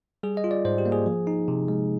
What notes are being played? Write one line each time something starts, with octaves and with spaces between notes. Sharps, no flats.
G3 G#4
D#5
F4
D5
G#2 C5
G4
A#3
G#4
F3
D#4
C3
G#3